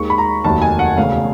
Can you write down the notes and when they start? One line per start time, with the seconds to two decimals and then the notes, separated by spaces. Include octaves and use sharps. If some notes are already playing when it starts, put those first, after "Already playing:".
Already playing: D#2 D#3 G#3 C#6
0.10 B5
0.18 A#5
0.44 F1 D#2 D#3 F#3 A5
0.62 G#5
0.79 F#5
0.97 E1 D2 C#3 F5